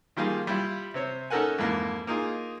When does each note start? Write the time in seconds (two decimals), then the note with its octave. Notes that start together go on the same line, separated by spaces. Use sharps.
0.17 D#3 F3 G3 A#3 F4 G#4
0.47 G3 E4 F4
0.94 C3 C4 C#5
1.30 C#4 D#4 A4 A#4 F#5 G#5
1.58 F2 G#2 E3 A#3
2.07 A#3 D#4 F4 G#4